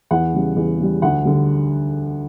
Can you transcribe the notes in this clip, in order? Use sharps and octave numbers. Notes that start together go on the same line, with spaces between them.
E2 F#5
C#3 G3
E2
C#3 G3
D2 F#5
D3 G3